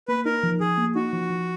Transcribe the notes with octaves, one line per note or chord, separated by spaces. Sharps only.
A#3 B4
D#4 A#4
F3
F3 G#4
A#3
D#4 F#4
F3
F3